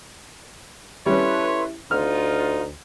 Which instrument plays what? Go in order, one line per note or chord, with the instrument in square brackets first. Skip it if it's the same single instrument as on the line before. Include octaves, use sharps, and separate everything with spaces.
[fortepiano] G3 C#4 [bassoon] E4 [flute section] A4 B4 C6 [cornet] C#5
[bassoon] D2 [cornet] D#4 [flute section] F4 [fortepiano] F6